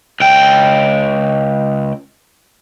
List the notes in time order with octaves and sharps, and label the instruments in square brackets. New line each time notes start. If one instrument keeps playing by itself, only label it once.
[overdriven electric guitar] C#2 G5